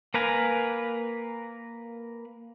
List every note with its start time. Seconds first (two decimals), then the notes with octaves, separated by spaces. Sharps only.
0.14 A#3 A#4 B4 F5 G#5